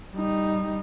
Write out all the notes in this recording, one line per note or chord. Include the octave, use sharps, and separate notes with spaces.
G3 D#4